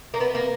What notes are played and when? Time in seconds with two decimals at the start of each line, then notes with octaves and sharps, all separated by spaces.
0.14 A#3
0.20 B3
0.35 A#3